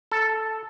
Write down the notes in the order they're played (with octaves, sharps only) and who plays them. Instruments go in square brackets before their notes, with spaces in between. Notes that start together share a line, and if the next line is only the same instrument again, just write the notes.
[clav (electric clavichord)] A4